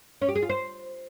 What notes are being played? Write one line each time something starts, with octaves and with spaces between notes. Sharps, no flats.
C#4
G4
G#4
F4
C5